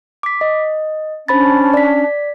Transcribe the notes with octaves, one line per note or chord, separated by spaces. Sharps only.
D6 B6
D#5
C#4 D4 C5 A5 B5 A6
D5 B6